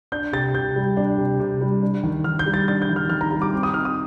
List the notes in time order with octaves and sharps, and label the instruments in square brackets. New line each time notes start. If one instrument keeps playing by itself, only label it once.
[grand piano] D4 G6
C3 A6
C3 G6
G3
D4
C3
C3
G3
D4
D#3
D#3 F6
G6
G3
A6
D4 A6
G6
D#3
F6
D#3 F6
A#5
G3 A#5
D6
C4
D#6
D#4 F6
D#6